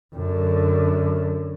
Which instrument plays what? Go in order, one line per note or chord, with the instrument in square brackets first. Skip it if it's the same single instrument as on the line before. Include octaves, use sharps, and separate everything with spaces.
[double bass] F#2 D3